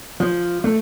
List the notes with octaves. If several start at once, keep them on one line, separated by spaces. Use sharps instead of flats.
F3
A3